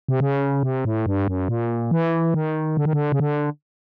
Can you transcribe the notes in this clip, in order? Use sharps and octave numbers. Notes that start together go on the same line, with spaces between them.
C3
C#3
C3
A2
G2
F#2
A#2
E3
D#3
D3
D#3
D3
C#3
D3